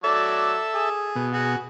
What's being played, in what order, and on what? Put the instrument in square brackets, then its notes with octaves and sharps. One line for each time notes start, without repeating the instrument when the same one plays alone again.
[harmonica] F#3 D5 [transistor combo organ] A4 E5
[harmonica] G#4
[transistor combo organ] B2
[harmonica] F#4 G#4